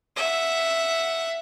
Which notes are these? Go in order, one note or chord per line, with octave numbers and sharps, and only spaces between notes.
E5 F#5